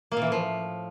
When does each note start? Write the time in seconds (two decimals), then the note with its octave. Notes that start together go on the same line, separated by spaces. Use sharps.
0.12 A#3
0.17 A#2
0.22 E3
0.27 A2
0.32 F3